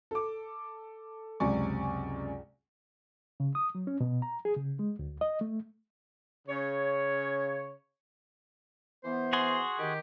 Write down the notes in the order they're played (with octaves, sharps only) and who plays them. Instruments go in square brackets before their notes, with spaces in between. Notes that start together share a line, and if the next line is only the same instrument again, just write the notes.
[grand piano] A4 D6
C#2 F#2 C3 D5 G#5 C#6
[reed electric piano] C#3
D#6
F#3
C#4
B2
A#5
G#4
C#3
G#3
D2
D#5
A3
[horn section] C#3 C#5
[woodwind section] E3 B3 C5
[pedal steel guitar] F#4 G#4 C6
[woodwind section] D#3 G4